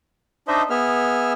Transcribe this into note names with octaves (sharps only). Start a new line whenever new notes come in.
D4 D#4 C5 D#5 E5
B3 G#4 E5 F6